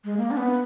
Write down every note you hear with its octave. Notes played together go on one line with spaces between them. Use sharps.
G#3
A#3
D4
B3